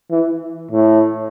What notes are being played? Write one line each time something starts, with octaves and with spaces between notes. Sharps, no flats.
E3
A2